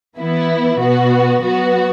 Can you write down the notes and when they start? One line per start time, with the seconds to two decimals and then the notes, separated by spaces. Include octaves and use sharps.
0.18 E3 B3 E4
0.80 B2 B3 F#4
1.42 F#3 B3 F#4